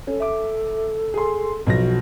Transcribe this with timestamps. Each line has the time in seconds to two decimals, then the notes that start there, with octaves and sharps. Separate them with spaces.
0.07 C#4 A4
0.20 E5 D6
1.14 G#4 C6
1.67 B1 F3 F#4 A#6